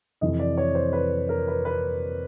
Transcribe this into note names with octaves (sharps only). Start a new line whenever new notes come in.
F2 C3 E3 D#5
D5
C#5
C5
B4
A#4
B4
B4